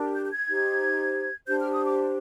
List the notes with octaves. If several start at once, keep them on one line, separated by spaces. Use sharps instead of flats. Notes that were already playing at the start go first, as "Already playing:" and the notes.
Already playing: D4 G4 A#4
G6
G6
G#6
D#4 G4 C5
D4 G4 C5 G6
F6
D#6
D6